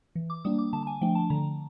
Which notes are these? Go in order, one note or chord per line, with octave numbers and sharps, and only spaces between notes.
E3
D6
G3 A#3 D4 D#6
D6
D3 A5
A5
G#5
F3 A3 D4 G5
A5
D3 A#5